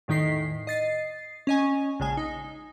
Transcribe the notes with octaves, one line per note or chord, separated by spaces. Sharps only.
E2 A2 D#3 D#4 B6 C7
D#5 A6 C7
C#4 D#5 G#5
A#1 C#3 G#3 G#5
D#4